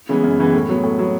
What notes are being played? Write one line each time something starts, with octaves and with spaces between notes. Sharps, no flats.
C#3 E3 G#3 B3
F#2
C#3 E3 G#3 B3
A2
F#3 B3
A2
F#3 B3